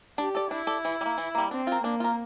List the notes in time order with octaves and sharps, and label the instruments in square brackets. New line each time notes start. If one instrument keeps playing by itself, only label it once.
[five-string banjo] D4 [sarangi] G4
[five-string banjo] A4 D5
[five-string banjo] D4 [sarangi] E4
[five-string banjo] A4 D5
E3
G3
A#3
E3
G3 A#3
[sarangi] C4 [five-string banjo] D4
[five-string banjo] F4 A#4
[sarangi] A#3 [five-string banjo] D4
[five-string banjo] F4 A#4